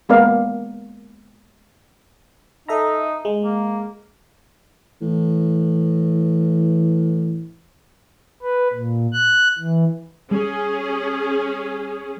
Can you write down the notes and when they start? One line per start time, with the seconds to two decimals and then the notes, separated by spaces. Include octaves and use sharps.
0.09 G#3 A#3 B3 A#4 D5 F5
2.68 D#4 A4 E5 A#5
3.25 G#3
3.42 A#3
5.02 A2 E3
8.42 B4
8.73 A#2
9.13 F#6
9.59 E3
10.31 G3 C#4 G#4